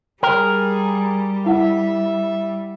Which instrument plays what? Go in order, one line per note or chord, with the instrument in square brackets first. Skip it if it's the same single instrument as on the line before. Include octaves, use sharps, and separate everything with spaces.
[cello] G3 [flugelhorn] G#4 [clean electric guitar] A#4 [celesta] G5
[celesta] E4 F#5 [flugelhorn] E5